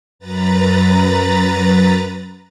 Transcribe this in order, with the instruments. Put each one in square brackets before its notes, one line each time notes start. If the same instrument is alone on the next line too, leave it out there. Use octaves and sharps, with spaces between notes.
[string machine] F#2 B4 A#5 A6